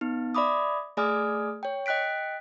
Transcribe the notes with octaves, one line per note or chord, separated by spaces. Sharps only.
B3 D#4
D5 E5 B5 D6 D#6
A3 G#4 D5 G#5 D#6 F6
C#5 G5
D#5 G5 F#6 B6 D7